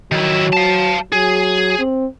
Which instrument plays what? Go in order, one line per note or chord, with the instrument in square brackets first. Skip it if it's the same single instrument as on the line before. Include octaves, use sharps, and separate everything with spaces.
[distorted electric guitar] D#3 E4 [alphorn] F#3
[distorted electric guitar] F5 A5
[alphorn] F#3 [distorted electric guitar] G#4
[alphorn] C4